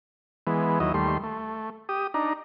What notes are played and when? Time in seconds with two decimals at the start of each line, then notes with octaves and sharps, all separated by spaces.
0.47 E3 G#3 B3
0.80 D#2 F#3 E4 D#5
0.94 D#2 G3 A3 C6
1.23 A3
1.89 G4 D#6
2.14 D4 D#4 A#5